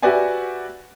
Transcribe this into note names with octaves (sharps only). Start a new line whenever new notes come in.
F#4 G4 B4 D5 E5 G#5